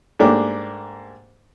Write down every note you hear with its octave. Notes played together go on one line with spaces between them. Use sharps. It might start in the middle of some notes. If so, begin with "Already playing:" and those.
G#2 A3 A#3 D4 G4